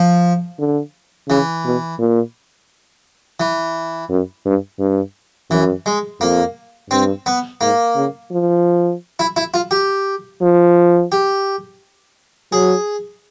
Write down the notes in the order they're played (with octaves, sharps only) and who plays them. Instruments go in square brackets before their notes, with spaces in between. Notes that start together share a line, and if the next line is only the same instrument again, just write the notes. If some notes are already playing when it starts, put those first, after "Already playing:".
Already playing: [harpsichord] F3
[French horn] D3
[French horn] C#3 [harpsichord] E3
[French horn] B2
A#2
[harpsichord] E3
[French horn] F#2
G2
G2
[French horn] F#2 [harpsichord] E3
[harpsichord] G#3
[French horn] F2 [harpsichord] A#3
[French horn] G2 [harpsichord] C4
[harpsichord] B3
[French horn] G#2 [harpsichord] A#3
[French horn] C#3
F3
[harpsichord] E4
E4
F4
G4
[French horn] F3
[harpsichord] G4
[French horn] F#3 [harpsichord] G#4